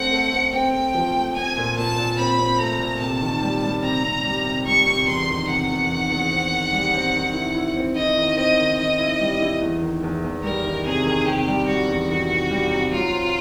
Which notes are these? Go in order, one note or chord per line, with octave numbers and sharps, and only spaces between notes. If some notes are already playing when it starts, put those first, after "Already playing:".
Already playing: A3 C4 F#5
A3
C4
C4 G5
A3
F3
A3
C4 G#5
A#2
A#2 A5
A#2
C4 B5
C4
A3 A#5
A#2
C3 A5
D#3
G3
G3
C3 A#5
C3
G3
C3
G3 C#6
C3
E2 C6
D#3
C3 F#5
E2
D#3
E2
C4
D#3
G3
C4
D#3
E4
E4
C4
E4 D#5
D#3
C4 D#5
D#3
D#3 D#5
E4
G3
E4
E2
D#3
E2
E2
G3 A#4
D#3
C3 G#4
D#3
C3 G4
G3
G3 F#4
E2
D#3 F#4
C3
G3
C3
F#3 F4
C4